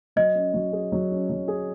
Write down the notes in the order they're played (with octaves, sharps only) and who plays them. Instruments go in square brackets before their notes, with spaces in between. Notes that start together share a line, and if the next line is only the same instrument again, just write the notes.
[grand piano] F#3 [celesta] D#5
[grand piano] C#4
F#3
G#4
F#3
C#4
F#3
G#4